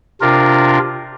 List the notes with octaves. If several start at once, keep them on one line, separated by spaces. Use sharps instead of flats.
C3 D4 F4 A#4